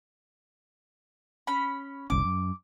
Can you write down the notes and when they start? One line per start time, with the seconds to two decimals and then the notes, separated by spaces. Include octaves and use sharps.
1.47 C#4 B5
2.10 F#1 C2 C#4 D6
2.24 F#2